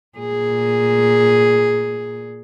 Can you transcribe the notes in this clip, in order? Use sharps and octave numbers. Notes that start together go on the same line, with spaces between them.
A#2 G#4